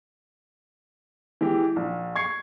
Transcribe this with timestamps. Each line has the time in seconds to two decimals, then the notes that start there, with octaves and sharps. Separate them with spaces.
1.41 E3 G#3 G4
1.76 A#1
2.15 C#6 G#6 C7 C#7